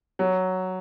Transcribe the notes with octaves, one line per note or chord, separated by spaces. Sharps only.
F#3